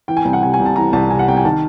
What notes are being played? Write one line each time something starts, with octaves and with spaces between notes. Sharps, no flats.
E3 G5
G#5
C2
F#5
C3 G#5
G#5
C2
A5
E3 A#5
C2 A5
C3 G#5
F#5
C2 G5
G#5
D#3 A5